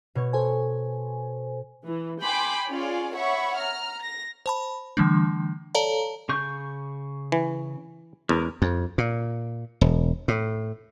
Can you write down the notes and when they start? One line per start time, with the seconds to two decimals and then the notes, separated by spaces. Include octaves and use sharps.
0.15 B2 C#5 C#6
0.33 A4 C5 G#5
1.84 E3
2.22 G5 G#5 B5 C6 D6
2.68 C#4 F4 G#4 D5 F5
3.13 C#5 E5 F#5 B5 C#6
3.56 A#5 F6
4.02 A#6
4.46 C5 A5 B5
4.97 D3 E3 G3 A3 D4
5.75 A4 C#5 D5 F5 A5 A#5
6.29 C#3 C#6 G6
7.32 E3
8.29 E2 G#3 C#4 A#4
8.62 F2
8.98 A#2
9.81 E1
10.28 A2